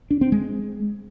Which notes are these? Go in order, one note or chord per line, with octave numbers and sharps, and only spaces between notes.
D4
C4
G#3